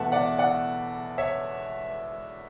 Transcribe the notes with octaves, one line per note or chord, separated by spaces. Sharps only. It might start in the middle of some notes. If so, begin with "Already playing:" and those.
Already playing: E2 B2 A3 E5 F#5 A5
D5 F#5
D5 F#5
C#5 E5